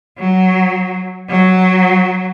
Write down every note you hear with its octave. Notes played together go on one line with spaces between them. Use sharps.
F#3
F#3